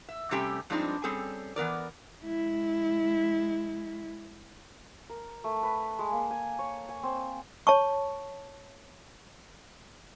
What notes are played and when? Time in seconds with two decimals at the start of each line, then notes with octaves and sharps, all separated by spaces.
0.09 E5
0.31 C3 G3 A3 C#4 G4 G5
0.70 G2 F3 G#3 C4 D4 D#4
1.04 G3 C4 C#4 G#4 A4
1.56 E3 B3 A#4 D5
2.24 G#3 E4
5.10 A#4
5.44 A3
5.63 B4
5.99 G#3
6.12 A#3
6.31 G#5
6.59 C#5
6.89 G#5
7.03 C4
7.67 C#5 A5 C#6